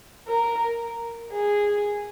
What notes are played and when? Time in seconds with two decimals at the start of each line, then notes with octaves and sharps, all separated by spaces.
0.28 A#4
1.33 G#4